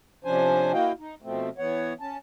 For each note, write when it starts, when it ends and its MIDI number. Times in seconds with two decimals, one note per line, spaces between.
0.25 0.72 48
0.25 0.72 53
0.25 0.72 61
0.25 0.72 62
0.25 0.72 72
0.25 0.72 80
0.72 0.92 58
0.72 0.92 64
0.72 0.92 66
0.72 0.92 75
0.72 0.92 77
0.72 0.92 79
0.99 1.15 63
1.22 1.49 47
1.22 1.49 53
1.22 1.49 57
1.22 1.49 60
1.58 1.93 52
1.58 1.93 59
1.58 1.93 73
1.58 1.93 78
2.00 2.17 61
2.00 2.17 81